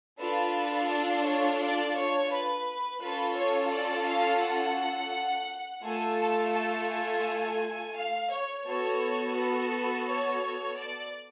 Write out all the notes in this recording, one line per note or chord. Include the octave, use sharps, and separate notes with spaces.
D4 F4 A4 B4
D5
C#5
D5
C#5
B4
C#4 F4 A4 B4
C#5
D5
F5
F#5
A3 F4 A4 G#5
A5
A5
G#5
F5
C#5
B3 F#4 A4 C#5
B4
C#5
D5